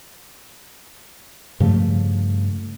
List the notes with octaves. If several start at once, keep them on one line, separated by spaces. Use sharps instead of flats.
G2 C#3 F3 A3